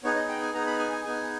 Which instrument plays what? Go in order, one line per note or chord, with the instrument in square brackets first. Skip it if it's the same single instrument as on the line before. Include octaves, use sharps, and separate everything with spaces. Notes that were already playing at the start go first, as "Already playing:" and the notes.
[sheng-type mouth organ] B3 D#4 G#4 C#5
D#5
G5
G#5
B3 D#4 G#4 A#5
B5
G#5
G#5
B3 D#4 G#4 G#5